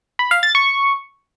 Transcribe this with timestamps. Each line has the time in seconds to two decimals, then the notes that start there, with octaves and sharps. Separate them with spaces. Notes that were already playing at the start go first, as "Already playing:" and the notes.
0.19 B5
0.31 F5
0.43 A6
0.55 C#6